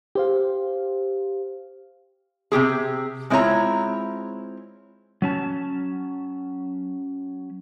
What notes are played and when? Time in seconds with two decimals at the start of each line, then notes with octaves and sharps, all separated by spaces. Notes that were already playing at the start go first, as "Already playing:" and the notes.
0.15 G4 C5 F5
2.52 C3 C#4 G4 G#4
3.30 G#3 C4 E4 F4 C#5 A#5
5.22 F#3 C#4 A5